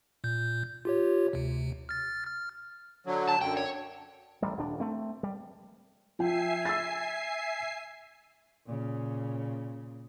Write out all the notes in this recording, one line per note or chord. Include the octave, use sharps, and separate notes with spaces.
A#2 G6
F4 G4 C#5
D2 C3
F6 A6
F6
D3 F#3
A5
F#2 D3 G5
C#5
A1 G3
D#1 D4
A3 C4
G3
F3 E5 G5 G#5 C7
E6 A6
A#2 C#3